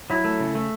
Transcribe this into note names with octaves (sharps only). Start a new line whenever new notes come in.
F#3 E4
A3
C#3
A3